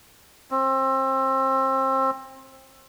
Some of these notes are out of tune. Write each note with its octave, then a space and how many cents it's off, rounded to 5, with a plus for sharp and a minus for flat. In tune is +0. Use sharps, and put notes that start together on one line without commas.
C4 +25